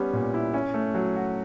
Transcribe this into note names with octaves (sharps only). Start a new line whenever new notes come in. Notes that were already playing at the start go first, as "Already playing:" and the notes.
Already playing: G3 B3 C#4
A#2
E4
C#4
A3
F#3
F#4